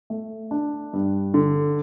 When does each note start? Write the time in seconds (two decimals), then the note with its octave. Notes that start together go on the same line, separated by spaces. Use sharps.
0.10 A3
0.51 D4
0.93 G2
1.34 D3